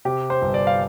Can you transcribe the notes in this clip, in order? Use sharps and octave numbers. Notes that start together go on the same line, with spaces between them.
C3 G4
C5
G1
D5
F5